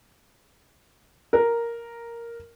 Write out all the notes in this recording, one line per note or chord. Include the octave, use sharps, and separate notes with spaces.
A#4